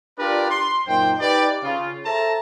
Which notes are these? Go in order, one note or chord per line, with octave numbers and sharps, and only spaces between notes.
D4 F4 G4 A#4 B4 D5
C6
F#2 A#2 D#4 C5 G5
D#4 G4 B4 D5
C#3 F4
A4 C5 E5 A5 A#5